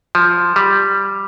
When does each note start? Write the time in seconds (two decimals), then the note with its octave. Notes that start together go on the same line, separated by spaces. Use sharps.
0.15 F3
0.56 G3